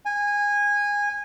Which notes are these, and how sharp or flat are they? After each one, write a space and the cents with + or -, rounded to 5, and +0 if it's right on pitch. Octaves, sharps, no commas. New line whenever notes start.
G#5 -20